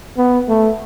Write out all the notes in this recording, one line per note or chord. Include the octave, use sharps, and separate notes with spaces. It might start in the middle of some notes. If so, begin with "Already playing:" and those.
B3
A3